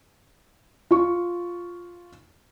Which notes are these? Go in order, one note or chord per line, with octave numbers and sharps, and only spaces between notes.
F4 C#6